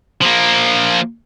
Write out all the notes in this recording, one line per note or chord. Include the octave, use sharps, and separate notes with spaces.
F3 A#3